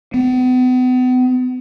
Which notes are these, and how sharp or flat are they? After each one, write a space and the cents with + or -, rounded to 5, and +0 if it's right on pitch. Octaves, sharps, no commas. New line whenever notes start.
B3 +40